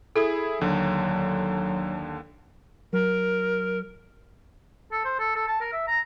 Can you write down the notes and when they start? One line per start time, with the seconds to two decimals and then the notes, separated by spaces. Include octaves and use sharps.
0.16 E4 G#4 A4
0.61 D#2 D3 F#3
2.93 F#3 A#4
4.92 A4
5.05 C5
5.19 A4
5.36 A4
5.48 A5
5.60 A#4
5.73 E5
5.88 A#5